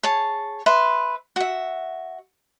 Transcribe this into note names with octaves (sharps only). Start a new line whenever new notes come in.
G#4 C#5 A5
B4 E5 C6
F#4 E5